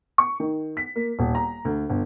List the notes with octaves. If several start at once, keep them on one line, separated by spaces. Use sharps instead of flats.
C#6
D#3
B6
A#3
D#1
A#5
D2
G1